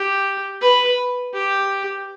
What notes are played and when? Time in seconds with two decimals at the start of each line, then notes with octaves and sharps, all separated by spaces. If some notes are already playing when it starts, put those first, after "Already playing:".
Already playing: G4
0.61 B4
1.34 G4